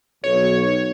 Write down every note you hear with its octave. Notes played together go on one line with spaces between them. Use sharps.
B1 C#5